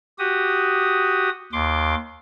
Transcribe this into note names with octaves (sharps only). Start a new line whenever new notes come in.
F#4 G4 D#6
D#2 C6 D6